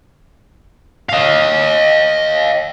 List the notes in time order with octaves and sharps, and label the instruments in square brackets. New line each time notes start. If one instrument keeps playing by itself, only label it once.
[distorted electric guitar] D#5 F5